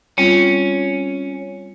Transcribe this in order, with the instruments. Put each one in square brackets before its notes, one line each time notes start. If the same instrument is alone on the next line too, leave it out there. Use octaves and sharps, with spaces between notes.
[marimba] G3 C4 F4 [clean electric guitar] C#4